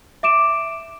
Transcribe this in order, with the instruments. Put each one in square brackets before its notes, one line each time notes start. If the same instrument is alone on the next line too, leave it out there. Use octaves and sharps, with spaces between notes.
[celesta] E5 D6 D7 E7